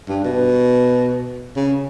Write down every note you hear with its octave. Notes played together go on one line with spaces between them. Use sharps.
G2
B2
C#3